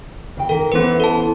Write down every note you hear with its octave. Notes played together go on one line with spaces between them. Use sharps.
C#3 G5
D#3 A4 A#4
E3 B3 C#4 B4 C5
A4 A5